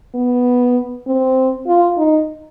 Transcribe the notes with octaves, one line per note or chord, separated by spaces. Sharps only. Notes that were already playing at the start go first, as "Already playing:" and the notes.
B3
C4
F4
D#4